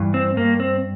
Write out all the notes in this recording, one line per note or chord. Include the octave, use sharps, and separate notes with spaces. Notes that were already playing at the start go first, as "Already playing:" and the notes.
Already playing: G2 E3
C4
G2 A#3
C4